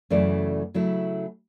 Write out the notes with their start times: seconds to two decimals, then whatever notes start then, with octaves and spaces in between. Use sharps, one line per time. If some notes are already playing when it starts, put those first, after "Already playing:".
0.10 F#2 C#3 E3 A3 C#4 D5
0.74 C#3 F#3 A3 E4